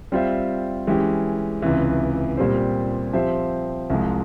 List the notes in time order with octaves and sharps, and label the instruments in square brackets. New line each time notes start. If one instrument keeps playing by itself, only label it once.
[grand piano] G3 C4 F4 C5 E5
E3 G#3 C#4 G4
C#2 C3 E3
A#2 G3 C4 G4 C5
F3 C4 G4 C5 E5
C2 C3 F3 G#3